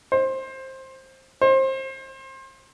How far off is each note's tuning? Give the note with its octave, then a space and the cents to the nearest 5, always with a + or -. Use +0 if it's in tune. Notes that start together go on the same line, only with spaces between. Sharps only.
C5 +15
C5 +25